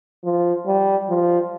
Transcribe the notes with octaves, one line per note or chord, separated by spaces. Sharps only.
F3
G3
F3